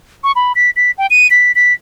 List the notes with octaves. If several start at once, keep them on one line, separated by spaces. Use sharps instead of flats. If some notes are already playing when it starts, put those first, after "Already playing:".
C#6
B5
B6
B6
G5
D#7
B6
B6